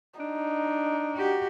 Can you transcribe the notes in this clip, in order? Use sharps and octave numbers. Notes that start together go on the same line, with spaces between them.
D4 D#4
F#4 G4